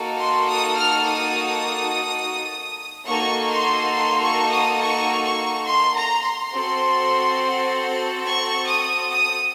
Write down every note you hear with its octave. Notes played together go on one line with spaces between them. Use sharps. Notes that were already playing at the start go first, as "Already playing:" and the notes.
Already playing: A#3 D#4 F#4 A4
C6
D#6
F6
D#6
A#3 D#4 F#4 A4 C#6
C6
C6
C#6
D#6
C#6
C#6
C6
A#5
C6
C4 F#4 A4
C#6
D#6
D#6